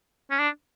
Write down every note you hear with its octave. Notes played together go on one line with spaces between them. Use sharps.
C#4
D4